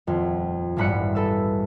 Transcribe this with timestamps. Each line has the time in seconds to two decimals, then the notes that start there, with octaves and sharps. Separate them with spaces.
0.07 D#1 F2
0.77 E1 A1 G2 B5 F#6 C#7
1.15 A4 B4 E6